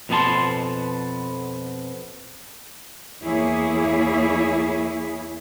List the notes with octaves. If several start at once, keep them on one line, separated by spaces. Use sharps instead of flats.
F2 B2 B3 G#4 A5 C6
E2 A#3 E4 G#4 C#5